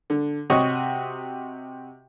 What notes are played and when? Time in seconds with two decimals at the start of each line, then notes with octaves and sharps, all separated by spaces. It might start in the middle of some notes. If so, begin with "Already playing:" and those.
0.10 D3
0.50 C3 F#4 C#5 D#5 C#6